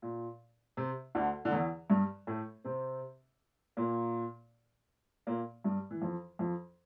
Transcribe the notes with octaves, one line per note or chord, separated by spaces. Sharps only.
A#2
C3
D2 D3
D3
E2 E3
G2 G3
A2 A3
C3 C4
A#2 A#3
A#2 A#3
G2 G3
E3
F2 F3
F2 F3